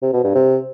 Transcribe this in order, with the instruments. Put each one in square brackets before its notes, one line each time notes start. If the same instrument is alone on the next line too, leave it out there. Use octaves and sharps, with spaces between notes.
[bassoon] C3
B2
G2
C3